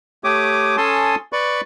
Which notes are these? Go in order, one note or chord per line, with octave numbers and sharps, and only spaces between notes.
A3 G4 C#5 D6 D#6
C#4 A4 G#5 A5 C6 D#6
B4 D5 B5 C#6